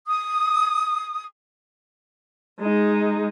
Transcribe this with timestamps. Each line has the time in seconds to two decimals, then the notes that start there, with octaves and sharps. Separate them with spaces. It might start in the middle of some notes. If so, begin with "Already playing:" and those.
0.06 D#6
2.60 G#3 D#4